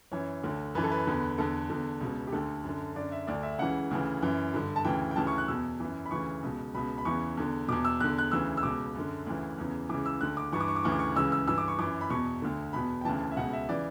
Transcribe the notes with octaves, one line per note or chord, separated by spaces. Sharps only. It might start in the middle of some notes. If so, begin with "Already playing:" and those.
F#2 E3 C#5
D2 D3
F#2 E3 B4
A4
B4
E2 D3
E2 D3 A4
E2 D3
C#2 B2
G4
D2 D3 A4
F#2
D3
F#2 D3 D5
E5
D2 D3 D5
E5
C#2 C#3 E3 F#5
D2 C#3 E3
F#2 E3
G2 D3
A5
D2 C#3 E3 G5
G5
D2 C#3 E3 A5
C#6
F#6
E2 B2 E6
F#2 E3
B5
D2 C#3 E3 C#6
C#2 B2
C#2 B2 B5
B5
E2 C#3 E3 C#6
E2 D3
E2 B2 D6
E6
E2 D3 F#6
F#6
D2 C#3 E3 E6
E6
C#2 B2 D6
F#2 D3
D2 C#3 E3
E2 C#3 E3
C#2 C#3 E3 D6
E6
D2 D3 F#6
D6
G2 E3 C#6
D6
C#6
D6
D2 C#3 E3 C#6
D6
C#6
C#2 C#3 E3 E6
E6
G2 E3 E6
D6
C#6
F#2 E3 D6
B5
E2 B2 C#6
D2 D3
E2 B2 B5
G5
D2 C#3 E3 A5
A5
E5
C#2 B2 F#5
E5
C#3 E3 D5